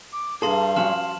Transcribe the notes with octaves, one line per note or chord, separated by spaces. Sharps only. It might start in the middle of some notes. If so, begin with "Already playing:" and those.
D6
G2 G#4 A4 F5 A5 A#5 C6
F3 C#4 F#4 F6 E7 F#7